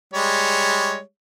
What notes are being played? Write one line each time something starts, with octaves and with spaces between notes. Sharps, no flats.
G3 G#3 C#5